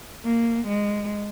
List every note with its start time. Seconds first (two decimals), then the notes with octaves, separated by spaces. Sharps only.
0.24 A#3
0.69 G#3